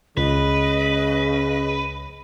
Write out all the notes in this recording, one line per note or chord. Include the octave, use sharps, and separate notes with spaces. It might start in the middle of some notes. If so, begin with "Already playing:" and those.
C#2 C#3 B4 D#5